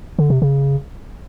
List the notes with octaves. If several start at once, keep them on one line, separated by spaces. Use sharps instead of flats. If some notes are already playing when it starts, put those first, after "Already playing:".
D3
C3
C#3